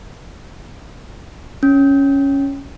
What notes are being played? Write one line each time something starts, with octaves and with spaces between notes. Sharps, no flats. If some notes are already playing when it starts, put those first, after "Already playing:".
C#4